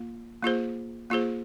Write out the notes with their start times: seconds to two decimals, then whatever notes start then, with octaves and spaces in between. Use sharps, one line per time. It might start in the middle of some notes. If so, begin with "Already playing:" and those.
Already playing: A#3 F4
0.43 A#3 F4 G#4 C5
1.10 A#3 F4 G#4 C5